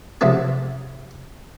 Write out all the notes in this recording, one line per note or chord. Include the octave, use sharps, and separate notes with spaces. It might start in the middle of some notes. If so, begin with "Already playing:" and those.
C3 F3 F#3 A3 C4 G#4